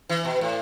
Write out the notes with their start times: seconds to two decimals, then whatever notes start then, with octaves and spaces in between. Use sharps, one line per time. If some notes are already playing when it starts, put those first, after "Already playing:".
0.09 E3
0.25 B2
0.41 A2